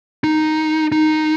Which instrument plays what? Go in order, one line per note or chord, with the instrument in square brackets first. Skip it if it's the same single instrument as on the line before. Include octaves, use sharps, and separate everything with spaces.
[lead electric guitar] D#4
D#4